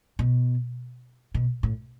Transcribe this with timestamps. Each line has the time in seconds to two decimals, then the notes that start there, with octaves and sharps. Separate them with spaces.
0.19 B2
1.34 B2
1.63 A2